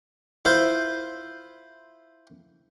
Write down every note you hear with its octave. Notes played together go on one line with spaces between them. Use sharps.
E4 F4 C5